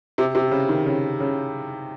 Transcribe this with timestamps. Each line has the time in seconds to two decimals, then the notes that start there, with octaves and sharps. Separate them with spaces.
0.18 C3
0.35 C3
0.51 C#3
0.69 D#3
0.86 C#3
1.20 C#3